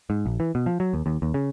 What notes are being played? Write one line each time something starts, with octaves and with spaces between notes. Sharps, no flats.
G#2
A#1
E3
B2
F3
F#3
D#2
D#2
D#2
C#3